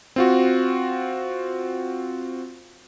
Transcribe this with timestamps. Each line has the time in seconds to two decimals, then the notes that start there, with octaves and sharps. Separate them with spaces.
0.16 C4 F4 F#4